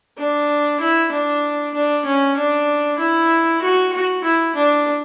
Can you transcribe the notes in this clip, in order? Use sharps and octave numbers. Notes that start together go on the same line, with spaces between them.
D4
E4
D4
D4
C#4
D4
E4
F#4
F#4
E4
D4